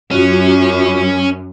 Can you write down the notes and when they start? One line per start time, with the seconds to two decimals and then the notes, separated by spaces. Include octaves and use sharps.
0.11 F#2 C#4 F4 F#4